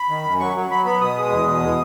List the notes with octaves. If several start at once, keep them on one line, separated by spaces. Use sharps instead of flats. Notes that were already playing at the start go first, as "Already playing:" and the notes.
Already playing: B5
D#3
F#2
F#3 C#6
F#3
F#3 B5
B3 B5
B2 D#6
G#3
E2
B2
G#3